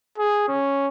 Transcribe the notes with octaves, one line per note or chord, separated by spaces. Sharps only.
G#4
C#4